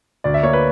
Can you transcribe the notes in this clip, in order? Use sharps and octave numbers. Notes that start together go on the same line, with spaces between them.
D2 D5
E5
A#3 C#5
B4